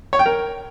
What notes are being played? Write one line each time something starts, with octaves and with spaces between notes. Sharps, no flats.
C#5
G5
A#4